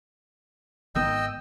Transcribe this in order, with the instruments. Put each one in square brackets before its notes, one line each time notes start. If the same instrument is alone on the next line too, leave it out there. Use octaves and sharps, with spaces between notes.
[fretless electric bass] G#1 D#3 B3 [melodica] D#5 E6 [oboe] G5